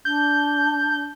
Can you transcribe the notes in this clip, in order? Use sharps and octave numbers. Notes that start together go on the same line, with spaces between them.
D4 G6